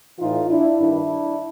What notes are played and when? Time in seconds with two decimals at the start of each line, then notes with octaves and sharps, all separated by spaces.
0.18 A2 E3 D#4 F4
0.49 D4 E4
0.78 G2 D#3 D4 E4